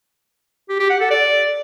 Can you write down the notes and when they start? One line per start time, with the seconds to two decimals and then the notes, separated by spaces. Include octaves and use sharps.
0.69 G4
0.79 G4
0.90 F#5
1.00 A4
1.10 D5